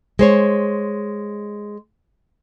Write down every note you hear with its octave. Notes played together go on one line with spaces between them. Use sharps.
G#3 C5 C#5